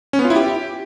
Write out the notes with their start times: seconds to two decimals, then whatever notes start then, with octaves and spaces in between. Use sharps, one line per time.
0.13 C#4
0.19 B3
0.25 F4
0.30 E4
0.36 G4